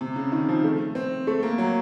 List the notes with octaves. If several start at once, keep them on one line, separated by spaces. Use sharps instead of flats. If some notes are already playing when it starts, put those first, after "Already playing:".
C3
C#3
D#3
F3
A3
C4
A3
A#3
F#3